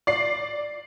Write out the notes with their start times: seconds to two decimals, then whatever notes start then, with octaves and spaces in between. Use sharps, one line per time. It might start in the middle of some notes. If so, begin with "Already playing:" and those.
0.07 D5 C7